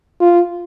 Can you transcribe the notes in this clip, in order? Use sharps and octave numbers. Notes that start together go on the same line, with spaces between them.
F4